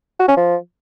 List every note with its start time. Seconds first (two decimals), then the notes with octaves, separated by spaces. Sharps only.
0.20 F#4
0.28 C#4
0.37 F3